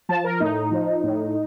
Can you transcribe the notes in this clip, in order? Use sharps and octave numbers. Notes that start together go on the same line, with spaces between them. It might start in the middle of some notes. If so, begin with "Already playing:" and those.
F3 A5
A#4
A2 D#4
F3
A2